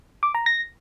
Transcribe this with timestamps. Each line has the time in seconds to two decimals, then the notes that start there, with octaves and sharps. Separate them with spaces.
0.23 D6
0.35 A#5
0.46 A#6